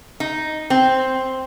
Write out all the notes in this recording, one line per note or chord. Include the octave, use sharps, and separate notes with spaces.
D#4
C4